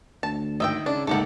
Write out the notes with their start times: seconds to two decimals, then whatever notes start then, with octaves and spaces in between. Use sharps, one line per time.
0.23 D2 A5
0.60 G#1 D#5 E5 G5 E6
0.86 C#3 D4
1.07 C#2 G#2 A3 A#3 G4 A4 F#5